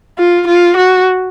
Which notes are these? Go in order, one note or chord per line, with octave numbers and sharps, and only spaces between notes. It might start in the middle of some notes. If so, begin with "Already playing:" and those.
F4
F4
F#4